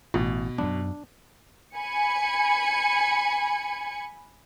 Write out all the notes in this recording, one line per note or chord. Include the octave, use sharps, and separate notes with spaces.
A1 B2
F#2 F#3 B3 D4
G#5 B5 G#6 C#7